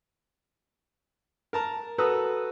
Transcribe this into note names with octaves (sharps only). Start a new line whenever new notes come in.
A#4 A5 A#5
F#4 A4 B4 A#5 D#6 E6